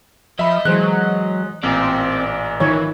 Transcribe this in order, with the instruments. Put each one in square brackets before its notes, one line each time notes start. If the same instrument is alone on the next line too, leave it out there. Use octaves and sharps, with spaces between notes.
[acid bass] F3 [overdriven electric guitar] D#5 [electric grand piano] E5 B5
[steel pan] E3 C5 [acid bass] F#3 [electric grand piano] G#3 F#6
[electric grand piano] A1 A#2 A#3 [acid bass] C4 [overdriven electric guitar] D5
[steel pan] D#3 F4 C#5 [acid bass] E3